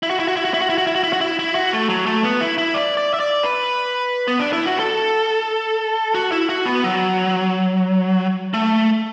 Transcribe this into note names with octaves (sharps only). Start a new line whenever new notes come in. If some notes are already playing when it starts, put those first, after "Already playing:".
E4
F#4
E4
F#4
E4
F#4
E4
F#4
E4
F#4
E4
F#4
E4
F#4
E4
E4
F#4
A3
F#3
A3
B3
E4
E4
D5
D5
E5
D5
B4
B3
D4
E4
F#4
A4
F#4
E4
F#4
B3
F#3
A3